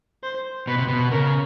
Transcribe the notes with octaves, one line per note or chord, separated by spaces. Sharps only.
C5
B2 B4
C3
B2
C#3 A#4